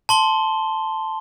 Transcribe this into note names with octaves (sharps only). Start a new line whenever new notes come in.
A5 C6 G7